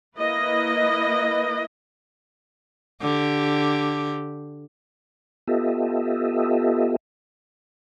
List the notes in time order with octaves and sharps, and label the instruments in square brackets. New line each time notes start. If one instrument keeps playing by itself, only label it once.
[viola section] A#3 E4 B4 D#5
[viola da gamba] D3 G4
[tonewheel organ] B3 F4 G4 A4 D#5 E5